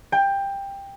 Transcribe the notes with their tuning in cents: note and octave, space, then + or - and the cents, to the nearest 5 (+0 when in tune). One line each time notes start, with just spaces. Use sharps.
G5 +15